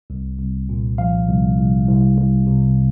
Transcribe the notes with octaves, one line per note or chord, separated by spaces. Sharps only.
C2
C2
A#2
F3 F5
C2
C2
C2
C2
C3